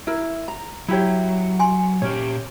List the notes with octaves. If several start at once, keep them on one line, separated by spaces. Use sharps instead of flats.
E4 A#4
A#5
F#3 E4 G4 C#5
G#5 C6
A#2 C#4 G4 C#5